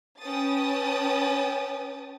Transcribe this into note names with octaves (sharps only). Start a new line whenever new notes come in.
C#4 B4 G5 A5 D#6 A6